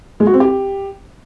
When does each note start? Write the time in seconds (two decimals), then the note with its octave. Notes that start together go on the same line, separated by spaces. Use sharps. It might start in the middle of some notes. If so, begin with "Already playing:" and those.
0.20 G#3
0.27 F#4
0.33 C4
0.40 G4